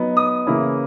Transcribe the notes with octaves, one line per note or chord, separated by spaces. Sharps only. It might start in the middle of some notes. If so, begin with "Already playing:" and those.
Already playing: F#3 B3 D#4
D#6
C#3 E3 A#3 C#4 E4